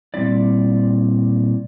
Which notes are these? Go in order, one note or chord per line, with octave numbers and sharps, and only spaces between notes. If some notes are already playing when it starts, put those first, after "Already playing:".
A#2 G3 C4 E4 D5